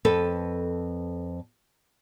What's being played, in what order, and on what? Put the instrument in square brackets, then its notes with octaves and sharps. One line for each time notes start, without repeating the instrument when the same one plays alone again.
[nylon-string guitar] F2 A4 B4